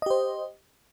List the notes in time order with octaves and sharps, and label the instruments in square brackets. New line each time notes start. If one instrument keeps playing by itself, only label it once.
[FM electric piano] D#5
G4
C5